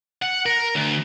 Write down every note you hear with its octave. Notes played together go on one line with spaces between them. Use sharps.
F#5
A#4
D2